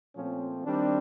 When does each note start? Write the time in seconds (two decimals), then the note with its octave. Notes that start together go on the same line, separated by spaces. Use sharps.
0.16 A#2 F3 A3 C4 C#4
0.65 D#3 G3 C4 D4